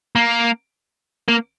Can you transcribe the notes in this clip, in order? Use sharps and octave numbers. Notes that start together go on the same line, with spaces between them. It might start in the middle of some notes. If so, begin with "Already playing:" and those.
A#3
A#3